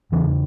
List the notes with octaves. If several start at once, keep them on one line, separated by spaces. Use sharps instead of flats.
E2 C#3 E3